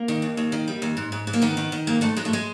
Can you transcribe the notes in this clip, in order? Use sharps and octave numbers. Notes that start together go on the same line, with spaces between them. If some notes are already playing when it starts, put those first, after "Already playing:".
Already playing: A#3
D#3
D#2
D#2
D#3
G3
D#2
G#2
G#2
G#2
A#3
D#3 B3
D#3
D#3
G#2 A#3
G#2 A3
G#2 G#3
A3
G#3